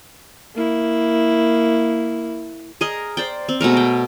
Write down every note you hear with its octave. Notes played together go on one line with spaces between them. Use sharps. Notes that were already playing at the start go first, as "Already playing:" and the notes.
A#3 E4
G#4 A#4 D#5
C5 D5 G5
C4
B2 G#3 A3 A#4
G5